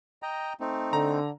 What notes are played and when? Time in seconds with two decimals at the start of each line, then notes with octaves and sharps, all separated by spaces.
0.23 D#5 G5 A#5
0.60 A3 C4 D#4
0.93 D3 A#5